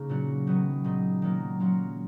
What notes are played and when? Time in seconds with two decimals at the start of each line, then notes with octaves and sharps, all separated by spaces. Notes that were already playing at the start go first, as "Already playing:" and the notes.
Already playing: C#3 A#3 D#4
0.09 A#2 F#3 C#4 F#4
0.47 D#3 F#3 B3
0.84 A#2 G#3 D#4
1.22 D#3 F#3 A#3
1.60 F#3 A#3 C#4 F4